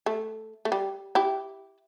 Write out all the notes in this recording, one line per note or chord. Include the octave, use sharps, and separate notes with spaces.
A3
A3
G3
E4 G4